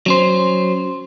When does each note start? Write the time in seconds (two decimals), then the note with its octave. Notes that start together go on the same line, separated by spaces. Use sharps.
0.06 F#3 C#4 C5